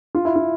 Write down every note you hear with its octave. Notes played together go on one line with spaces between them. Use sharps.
F4
E4
F4